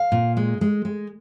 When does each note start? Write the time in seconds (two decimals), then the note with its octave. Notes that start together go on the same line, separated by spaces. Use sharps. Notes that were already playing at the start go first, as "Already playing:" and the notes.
Already playing: F5
0.12 A#2
0.37 G#3
0.61 G#3
0.85 G#3